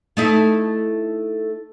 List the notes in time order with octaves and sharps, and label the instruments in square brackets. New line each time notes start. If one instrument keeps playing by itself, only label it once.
[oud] A3 D#4 E4